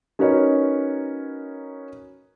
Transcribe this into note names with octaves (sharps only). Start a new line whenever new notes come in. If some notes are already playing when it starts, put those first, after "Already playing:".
C#4 D#4 F#4 A#4 B4 C#5